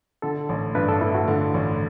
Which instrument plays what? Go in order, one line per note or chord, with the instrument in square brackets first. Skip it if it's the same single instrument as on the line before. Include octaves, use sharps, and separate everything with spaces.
[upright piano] D3 [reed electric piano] A4
[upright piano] A1
[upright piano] G2 [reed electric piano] B4
[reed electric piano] A4
[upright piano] A3 [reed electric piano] E4
[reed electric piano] F#4
[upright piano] D3
A1